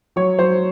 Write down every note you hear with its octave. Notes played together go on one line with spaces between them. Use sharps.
F#3 C#5
F#3 C5